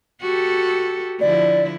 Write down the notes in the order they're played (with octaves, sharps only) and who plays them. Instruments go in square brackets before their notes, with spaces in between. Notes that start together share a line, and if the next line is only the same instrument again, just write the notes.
[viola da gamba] F#4 G4 A4
[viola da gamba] D3 F3 E4 [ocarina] D5